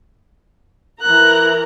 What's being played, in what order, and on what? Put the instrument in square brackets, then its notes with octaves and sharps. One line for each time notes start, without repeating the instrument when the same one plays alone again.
[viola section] E3 A#4 A#5 [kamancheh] F#6